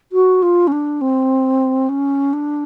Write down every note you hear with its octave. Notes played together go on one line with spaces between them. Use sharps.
F#4
F4
C#4
D4
C4
C#4
D4